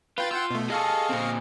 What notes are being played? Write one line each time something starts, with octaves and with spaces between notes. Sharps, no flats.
F4 B4 G5 A6
F4 F#5 G5 E6
B2 A3
G#4 A4 D#5 F5 C#6
A#2 C4